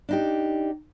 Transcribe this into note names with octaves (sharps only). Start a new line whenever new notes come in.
D4 D#4 G4